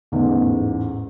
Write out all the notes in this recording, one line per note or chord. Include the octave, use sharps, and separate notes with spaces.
A1 E2 G#2